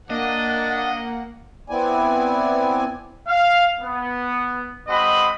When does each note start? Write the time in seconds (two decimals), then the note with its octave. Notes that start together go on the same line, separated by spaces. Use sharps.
0.10 A#3 D4 D#5 F#5
1.70 B3 C4 E4 D5 G#5
3.28 F5
3.81 B3
4.88 G#3 C4 F#4 D#5 F#5 B5